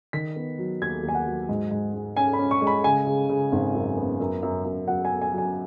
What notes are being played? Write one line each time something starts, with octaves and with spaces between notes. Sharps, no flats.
D#3 B6
B3
F#3
D#2 G#6
D#2
G#5
F#5
F#3
G#2
G#2
G#3
C#4 G#5
B5
C#4
C#6
G#3
B5
C#3 G#5
C#3
C#3
G#1
F#2
B3
F#2
F#2
F#2
F#3 F#5
G#5
B3
G#5
F#3
G#5